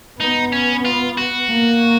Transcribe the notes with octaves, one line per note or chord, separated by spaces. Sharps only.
B3 D#4
C#4
F4
F#4
A#3